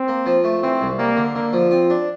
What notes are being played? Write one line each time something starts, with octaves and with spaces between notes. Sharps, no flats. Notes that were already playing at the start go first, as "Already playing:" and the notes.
Already playing: C4
A#3
F3
A3
E3 C4
C2
G3 A#3
D3
D3 A#3
F3
C4 F4
D4